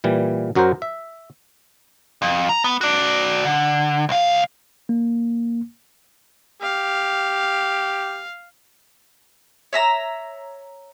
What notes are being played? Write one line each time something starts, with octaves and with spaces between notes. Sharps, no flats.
A#2 E3 G3
F#2 F#3 F#4 A#4 C5
E5
F2
A#5
B3
F#4 D5
D3
C2 F5
A#3
G4 F5
C#5 E5 A#5 E6